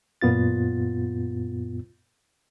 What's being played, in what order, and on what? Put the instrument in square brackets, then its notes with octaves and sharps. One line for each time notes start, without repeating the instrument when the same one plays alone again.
[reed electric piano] F#2 A#2 B3 F4 A6